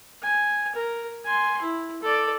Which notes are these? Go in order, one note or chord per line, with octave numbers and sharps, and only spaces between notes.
G#5
A#4
G#5 C6
E4
A4 D5